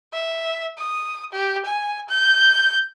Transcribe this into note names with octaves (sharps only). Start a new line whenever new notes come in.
E5
D#6
G4
G#5
G6